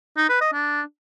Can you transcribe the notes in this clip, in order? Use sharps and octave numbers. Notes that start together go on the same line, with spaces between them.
D#4
B4
D#5
D4